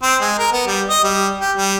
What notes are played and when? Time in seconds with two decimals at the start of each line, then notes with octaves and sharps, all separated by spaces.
0.03 C4
0.21 G#3
0.38 A#4
0.52 B3
0.67 G3
0.90 D#5
1.04 G3
1.41 G4
1.57 G3